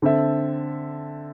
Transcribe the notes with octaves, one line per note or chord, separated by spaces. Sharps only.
D3 C4 A4 E5